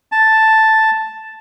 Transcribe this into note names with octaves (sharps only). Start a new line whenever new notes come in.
A5